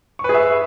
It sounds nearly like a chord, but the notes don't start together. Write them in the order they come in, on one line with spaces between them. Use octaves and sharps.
C#6 B4 G#4 E5